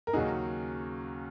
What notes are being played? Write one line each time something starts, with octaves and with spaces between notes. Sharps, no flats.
A#4
D#2 C#3 F#3 C#4 D#4 F#4 G#4